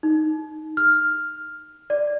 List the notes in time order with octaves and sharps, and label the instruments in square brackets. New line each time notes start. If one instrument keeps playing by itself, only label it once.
[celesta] D#4
F6
D5